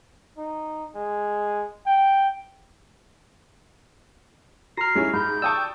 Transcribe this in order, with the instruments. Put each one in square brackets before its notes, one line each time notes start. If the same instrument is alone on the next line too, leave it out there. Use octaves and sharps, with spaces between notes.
[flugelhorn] D#4
G#3
G5
[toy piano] F#4 A#5 [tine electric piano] F6 A#6 [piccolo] C7
[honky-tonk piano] G#3 C#4 E4 [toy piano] D#4 G4 E5
[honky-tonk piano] G#2 [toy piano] B5 [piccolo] G6
[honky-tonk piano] D5 G5 A5 [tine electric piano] C#6 D#6 E6